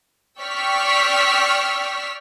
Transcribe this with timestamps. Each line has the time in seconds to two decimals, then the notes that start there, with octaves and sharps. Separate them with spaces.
0.41 D5 G5 C#6 E6 F6 B6